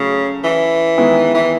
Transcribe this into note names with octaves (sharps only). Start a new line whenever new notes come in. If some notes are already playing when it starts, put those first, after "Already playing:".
Already playing: C#3 F#3 A3 C#4
E3
D#3 G#3 B3 E4 G#4
E3